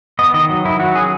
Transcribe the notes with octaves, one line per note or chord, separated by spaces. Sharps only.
B3 D#5
D#3 D#5
F#3
D#3 E4
F#3 F#4
C#4 G#4